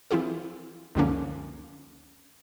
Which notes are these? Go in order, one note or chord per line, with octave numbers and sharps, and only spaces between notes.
E3 C4 E4 F4 G#4
C#2 F#2 D3 F3 A#3 C#4